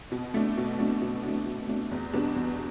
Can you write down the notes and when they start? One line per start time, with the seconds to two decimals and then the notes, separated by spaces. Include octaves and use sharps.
0.12 B2
0.34 A3 D4
0.57 B2
0.79 A3 D4
1.02 B2
1.23 A3 D4
1.46 B2
1.68 A3 D4
1.91 E2
2.13 B2 G3 B3 D4
2.36 E2